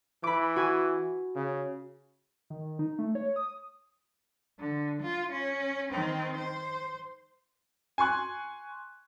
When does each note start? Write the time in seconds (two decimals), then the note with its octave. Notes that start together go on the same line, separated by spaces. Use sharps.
0.24 E3 B5 D6
0.56 F#4 G#5
1.35 C#3
2.50 D#3
2.79 D#4
2.99 A3
3.15 C#5
3.36 D#6
4.59 D3
5.03 F4
5.33 C#4
5.91 D#3 C4
6.37 C5
7.98 G#5 C6 C#6 F#6 G#6